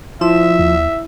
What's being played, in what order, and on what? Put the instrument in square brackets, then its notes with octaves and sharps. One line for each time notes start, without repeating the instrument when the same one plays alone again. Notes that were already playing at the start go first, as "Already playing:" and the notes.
[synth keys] F3 E7 [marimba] E4 [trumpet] E5
[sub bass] D#2